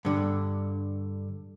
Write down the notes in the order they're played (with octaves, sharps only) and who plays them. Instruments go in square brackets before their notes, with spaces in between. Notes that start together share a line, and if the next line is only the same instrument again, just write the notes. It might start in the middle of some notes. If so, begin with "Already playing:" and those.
[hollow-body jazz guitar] G2 D3